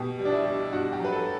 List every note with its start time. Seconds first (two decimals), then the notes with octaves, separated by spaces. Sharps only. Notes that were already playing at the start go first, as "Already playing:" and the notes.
Already playing: B2 G4
0.19 G3
0.25 D4
0.32 E4
0.46 G3
0.72 G2 F#4
0.93 G4
0.99 F#3
1.05 B4
1.12 A4